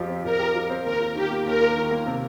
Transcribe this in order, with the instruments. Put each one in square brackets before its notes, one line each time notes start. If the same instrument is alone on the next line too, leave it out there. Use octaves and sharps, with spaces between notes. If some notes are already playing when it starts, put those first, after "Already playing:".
Already playing: [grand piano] F2 F3 G4
C4
[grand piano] F2 [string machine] A#4
[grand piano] G4
F3
C4
[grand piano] D#2 [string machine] A#4
[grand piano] F4
[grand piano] D#3 [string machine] G4
[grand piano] A#3
[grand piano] D#2 [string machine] A#4
[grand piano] F4
D#3
A#3
C3